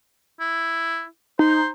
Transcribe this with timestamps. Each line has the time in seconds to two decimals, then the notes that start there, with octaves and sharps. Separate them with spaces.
0.40 E4
1.39 D#4 C5